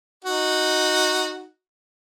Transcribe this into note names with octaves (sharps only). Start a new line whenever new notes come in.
D#4 F#4